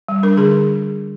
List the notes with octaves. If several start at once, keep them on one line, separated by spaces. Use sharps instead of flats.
G3
D4 A#4
D3 G#4